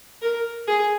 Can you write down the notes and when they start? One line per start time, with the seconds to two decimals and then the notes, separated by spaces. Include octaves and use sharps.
0.22 A#4
0.67 G#4